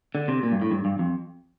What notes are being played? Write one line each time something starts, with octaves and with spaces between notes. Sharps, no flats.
D3
C3
A#2
G2
A2
G2
G2
F2